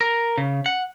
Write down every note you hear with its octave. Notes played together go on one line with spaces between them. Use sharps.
A#4
C#3
F#5